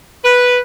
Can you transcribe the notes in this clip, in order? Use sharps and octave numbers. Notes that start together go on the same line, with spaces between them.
B4